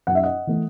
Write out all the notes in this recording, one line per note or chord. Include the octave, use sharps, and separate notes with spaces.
F#2 F#5
E5
D#5 F#5
E3 A3